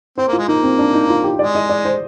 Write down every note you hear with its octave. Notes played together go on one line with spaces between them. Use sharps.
C4 C5
A#3
G#3 F4
A#3 D#4
C4
D4
D#4
F4
G4
G#3 D5
D#5
D5
C5